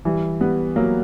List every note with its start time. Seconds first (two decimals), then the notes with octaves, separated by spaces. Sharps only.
0.05 E3 G3
0.41 G3 B3
0.76 F#3 A#3